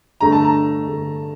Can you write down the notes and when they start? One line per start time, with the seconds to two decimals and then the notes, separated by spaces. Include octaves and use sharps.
0.21 G2 D3 A3 A#5
0.32 A5
0.45 A#5
0.86 G2 D3 A3